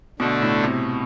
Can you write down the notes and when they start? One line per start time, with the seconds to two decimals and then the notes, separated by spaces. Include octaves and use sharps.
0.19 B2 D3 A3 D4
0.42 A2
0.64 C3